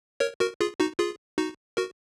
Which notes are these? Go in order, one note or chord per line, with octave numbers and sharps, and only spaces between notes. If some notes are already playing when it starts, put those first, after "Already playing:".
A#4 C#5
F#4 A#4
F4 G#4
D#4 F#4
F4 G#4
D#4 F#4
F#4 A#4